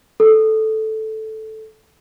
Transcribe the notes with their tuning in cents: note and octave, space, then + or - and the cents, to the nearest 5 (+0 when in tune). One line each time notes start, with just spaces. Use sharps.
A4 -5